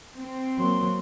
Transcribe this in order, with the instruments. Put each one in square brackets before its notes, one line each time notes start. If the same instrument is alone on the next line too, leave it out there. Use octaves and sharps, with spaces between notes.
[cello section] C4
[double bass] F#3 A#3 [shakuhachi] C6